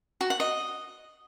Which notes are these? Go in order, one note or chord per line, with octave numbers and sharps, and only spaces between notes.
F#4
F#5
D#5